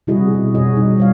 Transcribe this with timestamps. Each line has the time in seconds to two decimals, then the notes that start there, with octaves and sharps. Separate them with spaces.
0.07 C3 G3 E4 F#4 G#4 D#5
0.34 B2
0.55 F#4 G#4 C#5 D#5
0.76 G3 D#4
0.98 G3 C#5 F5